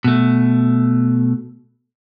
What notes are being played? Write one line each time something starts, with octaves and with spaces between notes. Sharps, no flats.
B2 A3